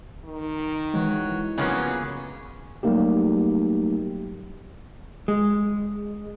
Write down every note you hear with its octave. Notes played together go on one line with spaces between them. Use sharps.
D#3
E3 G#3 F#4 C#5
C#3 F3 F#3 A#3 B3 G#4 C#5
F#3 G3 A3 A#3 D#4 G4
G#3